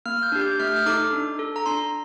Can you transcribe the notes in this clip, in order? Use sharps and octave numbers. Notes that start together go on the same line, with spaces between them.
A#3 F6
G6
D4 G4
G6
A3 F6
G6
F6
D#4 A4 D6
D4
A4
A#5
D4 C6